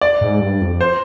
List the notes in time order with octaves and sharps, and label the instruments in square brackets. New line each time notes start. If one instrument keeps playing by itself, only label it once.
[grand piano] D5
[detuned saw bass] G#2
G2
F2
[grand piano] C5